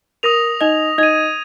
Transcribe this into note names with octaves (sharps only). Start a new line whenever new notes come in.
A#4 D#6 A#6 F7
D#4 D#5
D#4 D#5 G#6 D#7